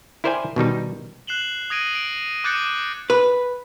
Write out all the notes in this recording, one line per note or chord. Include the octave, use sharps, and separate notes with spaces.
E4 A#4 C5 D5 G5 G#5
B2 D#3 G3 D#4
F#6 C7 E7 F#7 G7
D#6 G#6 A#6 D7 D#7
D7
D6 F#6 G6 A6 C#7 D#7
B4